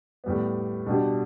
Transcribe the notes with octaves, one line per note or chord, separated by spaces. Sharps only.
A2 G3 B3
B2 G3 D4 G4